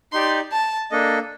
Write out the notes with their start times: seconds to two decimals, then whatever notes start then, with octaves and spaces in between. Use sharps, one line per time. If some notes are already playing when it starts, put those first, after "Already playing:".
0.12 D#4 G4 D5 C6
0.52 A5
0.91 A#3 D4 A4 D#5